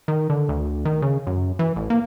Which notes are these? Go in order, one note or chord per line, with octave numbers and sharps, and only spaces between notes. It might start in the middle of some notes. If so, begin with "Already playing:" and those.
D#3
D3
D2
D#3
C#3
F#2
E3
A1
A#3